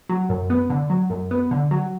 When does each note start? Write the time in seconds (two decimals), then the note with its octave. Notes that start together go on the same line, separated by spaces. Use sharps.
0.09 F#3
0.29 F#2
0.50 B3
0.70 D3
0.90 F#3
1.10 F#2
1.31 B3
1.51 D3
1.71 F#3